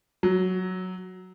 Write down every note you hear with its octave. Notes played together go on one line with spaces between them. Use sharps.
F#3